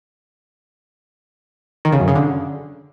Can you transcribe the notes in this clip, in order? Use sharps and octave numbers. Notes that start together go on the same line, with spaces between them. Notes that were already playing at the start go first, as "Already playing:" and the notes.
D#3
C#3
F#2
C#3
D3